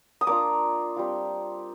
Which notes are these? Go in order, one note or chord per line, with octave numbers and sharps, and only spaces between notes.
D#6
A#3 D4 F4 D6
G3 C4 F4